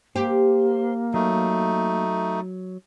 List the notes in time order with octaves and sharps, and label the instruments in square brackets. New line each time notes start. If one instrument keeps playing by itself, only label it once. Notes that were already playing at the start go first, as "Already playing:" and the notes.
[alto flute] A#3 [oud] G4 [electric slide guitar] C5
[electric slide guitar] F#3 [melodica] A3 D#4